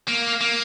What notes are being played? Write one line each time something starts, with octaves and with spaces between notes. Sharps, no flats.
A#3
A#3